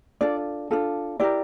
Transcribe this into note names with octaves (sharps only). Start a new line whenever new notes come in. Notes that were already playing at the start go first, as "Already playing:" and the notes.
D4 F4 A4 D5
D4 F4 A4
E4 G4 A#4 D5